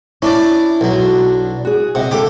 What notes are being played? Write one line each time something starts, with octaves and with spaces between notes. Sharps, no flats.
C#4 D4 E4 D5
B1 F#3 B3
D4
F#4 G#4
C3 D#5 F#5
D3 A#3 G4 A4 D6